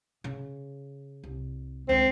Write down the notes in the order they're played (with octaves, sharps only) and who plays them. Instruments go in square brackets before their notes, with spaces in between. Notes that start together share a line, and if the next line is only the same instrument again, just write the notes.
[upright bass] C#3
C2
[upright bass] C#2 D3 [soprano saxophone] C4